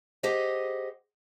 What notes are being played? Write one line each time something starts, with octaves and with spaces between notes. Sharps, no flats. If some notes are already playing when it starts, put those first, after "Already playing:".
G4 G#4 C5 D#5 F#5